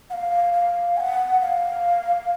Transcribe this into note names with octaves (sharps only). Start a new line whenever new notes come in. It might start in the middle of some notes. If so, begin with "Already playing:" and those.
F#5
F5
F5
G#5
F#5
F5